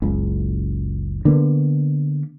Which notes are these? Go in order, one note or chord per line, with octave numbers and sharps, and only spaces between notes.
F#1 C#2
D3 A#3 B3